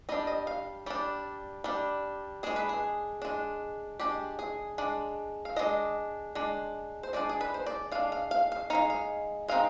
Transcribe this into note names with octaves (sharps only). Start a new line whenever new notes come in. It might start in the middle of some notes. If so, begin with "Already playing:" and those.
G3 D4 D#5
D#5
F5
G3 D4 D5
G3 D4
G#3 D4 G#4
B4
G#4
G#3 D4
G#3 D4 G4
G#4
G#3 D4
F5
G#3 D4 D#5
G#3 D4
C5
G#3 D4 D5
G#4
B4
C5
D5
G#3 D4 F5
F5
F5
F5
G#3 C4 D#4 F5
F5
G#3 C4 D#4 F5